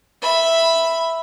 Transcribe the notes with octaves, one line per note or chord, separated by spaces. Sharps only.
E5 B5